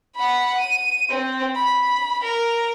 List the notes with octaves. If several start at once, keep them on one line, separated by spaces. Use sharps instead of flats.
F#5 B5
D#7
C4
B5
A#4